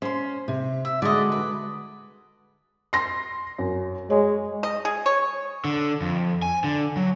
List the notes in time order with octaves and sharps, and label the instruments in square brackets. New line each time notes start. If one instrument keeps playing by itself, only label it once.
[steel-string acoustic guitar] C#4 [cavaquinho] C5 C6
[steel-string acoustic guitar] C3
[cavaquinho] E5
[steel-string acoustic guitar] D3 G#3 F#4 [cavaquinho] D5 D#5
[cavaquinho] B4
[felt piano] C6 A#6
F#2
[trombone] G#3 [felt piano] C#5
[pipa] D#5
G#4
C#5
[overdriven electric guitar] D3
F2
G#5
D3
F#3